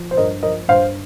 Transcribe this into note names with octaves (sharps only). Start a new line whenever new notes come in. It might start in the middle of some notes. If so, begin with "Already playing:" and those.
Already playing: F3
C5
G2 A#4 D#5
F3 A#4 D#5
G2 C5 F5